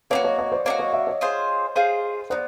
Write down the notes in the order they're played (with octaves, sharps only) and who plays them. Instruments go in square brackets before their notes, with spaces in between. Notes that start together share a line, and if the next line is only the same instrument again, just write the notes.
[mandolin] A#3 D4 F#4 [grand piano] B4 C#5
[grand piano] C#5 D#5
C#5 D#5
C5 D5
[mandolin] A#3 D4 [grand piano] C#5 D#5
[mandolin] F#4
[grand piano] C#5 D#5
D5 E5
C#5 D#5
[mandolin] F4 G#4 C5
F4 G#4 C5
[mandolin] B3 D#4 [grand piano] C5 D5